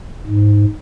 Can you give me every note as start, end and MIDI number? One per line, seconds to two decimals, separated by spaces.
0.27 0.65 44